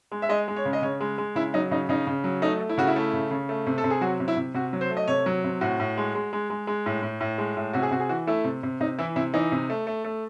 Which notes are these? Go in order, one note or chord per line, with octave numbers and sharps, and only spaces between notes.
G#3
E5
G#3 D#5
G#3
C#5
C#3
D#5
C#3 C#5
G#3
G#3
C#3 E4
F#3 D#4
C#3 D#4
C#3 D#4
C#3
F#3
A3 D#4
A3
E4
C#3 F#4
E4
A3
C#3
C#3
A3
C3
A4
C3
G#4
F#3 F#4
C3
E4
C3
C3 F#4
F#3
C5
A3
D#5
C3 C#5
F#3
C3
A2 F#4
A2
G#3
G#3
G#3
G#3
G#3
A2
A2
A2
G#3
A2
C3 F#4
G#4
C3 F#4
G#4
E3 F#4
A3 E4
C3
C3
C3 D#4
E3 E4
C3 E4
E3 D#4
C3
A3
A3
A3